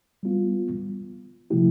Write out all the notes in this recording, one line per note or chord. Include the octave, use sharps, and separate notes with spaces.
G3 B3 F4
C3 F3 A3 E4 G4